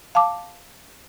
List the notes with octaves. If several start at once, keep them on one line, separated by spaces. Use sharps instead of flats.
F5 A5 D6